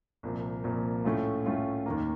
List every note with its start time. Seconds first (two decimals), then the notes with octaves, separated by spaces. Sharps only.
0.23 C2 A#2 F3 A#3
0.64 C2 A#2 F3 A#3
1.04 A2 A3 C#4 F4
1.46 A2 A3 C#4 F4
1.86 D#2 D#3 A#3